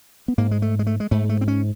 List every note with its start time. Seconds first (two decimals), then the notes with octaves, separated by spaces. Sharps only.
0.28 B3
0.38 G#2 A#3
0.51 G#3
0.62 A3
0.79 G#3
0.87 A3
1.00 G#3
1.11 G#2 A3
1.29 A3
1.41 C4
1.48 C#4